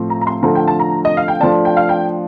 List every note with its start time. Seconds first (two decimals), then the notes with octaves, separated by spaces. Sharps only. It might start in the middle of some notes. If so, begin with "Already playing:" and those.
Already playing: A2 F3 C4
0.10 A#5
0.21 A#5
0.27 C6
0.42 D3 F3 A3 A#5
0.55 G5
0.68 A5
0.79 A#5
1.05 D#5
1.17 F5
1.28 G5
1.40 F3 A3 D4 A5
1.65 G5
1.77 F5
1.89 G5